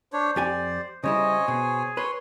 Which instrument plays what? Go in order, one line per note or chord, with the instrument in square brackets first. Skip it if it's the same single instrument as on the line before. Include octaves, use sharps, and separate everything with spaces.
[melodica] D4 C#5 [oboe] C5
[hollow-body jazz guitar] F2 G4 G#5 [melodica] D5
[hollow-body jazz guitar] C#3 G3 E4 [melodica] C5 C#5 G#5 [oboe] D#5
[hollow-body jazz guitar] B2 [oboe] G#4
[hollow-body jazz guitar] B4 [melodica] C#5 C6